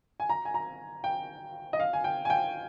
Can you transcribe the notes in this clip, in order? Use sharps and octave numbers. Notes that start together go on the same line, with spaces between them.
G#5
A#5
G#5
A#5
G5
D#5
F5
G#5
G5
G#5
G5